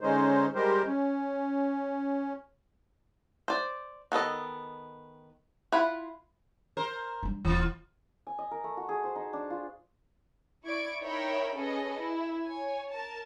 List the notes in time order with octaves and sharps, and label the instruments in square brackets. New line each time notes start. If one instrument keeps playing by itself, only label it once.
[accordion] D3 G#3 C#4 D#4 C5
G3 G#3 G4 A#4 C5
C#4
[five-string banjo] C5 D5
D#3 B3 A4 D#5
E4 F4 F#5 B5
[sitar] A#4 C5
[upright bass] G3 D4
[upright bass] D#1 [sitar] E3 F4
[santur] G#5
D#5
A#4
A3
F#4
G#4
C5
D#4
D4
F4
[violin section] E4 D5 C#6 G#6 D7
D#4 A#4 C#5 E5 G5 B5
C#4 G#4 A4 B4 D#5
E4
C#5 G#5
A#4 A5